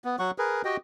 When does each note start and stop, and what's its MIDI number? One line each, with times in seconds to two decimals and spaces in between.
0.04 0.16 59
0.19 0.31 54
0.19 0.31 78
0.19 0.31 85
0.38 0.62 68
0.38 0.62 70
0.38 0.62 71
0.65 0.77 66
0.65 0.77 67
0.65 0.77 75
0.65 0.77 79